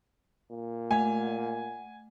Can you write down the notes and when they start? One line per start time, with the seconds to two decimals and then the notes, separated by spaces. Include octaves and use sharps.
0.50 A#2
0.91 A3 F#5 G#5